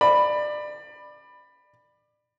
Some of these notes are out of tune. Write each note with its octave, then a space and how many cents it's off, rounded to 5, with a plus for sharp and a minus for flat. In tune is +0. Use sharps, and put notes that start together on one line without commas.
D5 +25 B5 +0